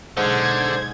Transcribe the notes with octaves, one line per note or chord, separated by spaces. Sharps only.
B1 G#2 D3 G#4 C5 G#6